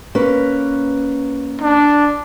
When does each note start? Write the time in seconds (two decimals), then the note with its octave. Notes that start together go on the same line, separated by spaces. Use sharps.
0.15 A#3 C#4 B4
1.61 D4